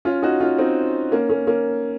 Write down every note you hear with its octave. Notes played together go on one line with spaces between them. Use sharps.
C#4 F4
D#4 F#4
C#4 F4
C4 D#4
A#3 C#4
A#3 C#4
A#3 C#4